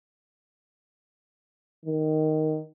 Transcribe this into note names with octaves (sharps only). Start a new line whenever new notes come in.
D#3